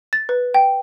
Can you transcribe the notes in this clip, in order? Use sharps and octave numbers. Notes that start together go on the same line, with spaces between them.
A6
B4
G5